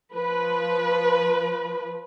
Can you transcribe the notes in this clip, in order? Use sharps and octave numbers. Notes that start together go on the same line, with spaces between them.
F3 B4